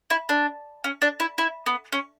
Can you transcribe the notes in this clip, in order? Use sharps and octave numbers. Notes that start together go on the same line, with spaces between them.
E4
D4
C#4
D4
E4
E4
B3
C#4